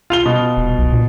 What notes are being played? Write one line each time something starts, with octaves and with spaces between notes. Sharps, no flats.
F4 F7 G7
B2
D#1
B1
A#2